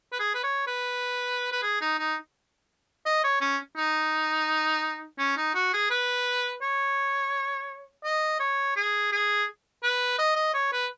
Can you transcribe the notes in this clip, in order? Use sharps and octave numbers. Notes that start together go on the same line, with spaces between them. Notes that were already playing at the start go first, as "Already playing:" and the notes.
B4
G#4
B4
C#5
B4
B4
G#4
D#4
D#4
D#5
C#5
C#4
D#4
C#4
D#4
F#4
G#4
B4
C#5
D#5
C#5
G#4
G#4
B4
D#5
D#5
C#5
B4